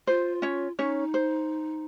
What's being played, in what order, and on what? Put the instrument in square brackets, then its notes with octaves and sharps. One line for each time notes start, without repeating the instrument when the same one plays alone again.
[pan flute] F4 [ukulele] C5
[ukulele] C#4 C#5
[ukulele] C#4 C#5 [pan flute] D#4
[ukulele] C5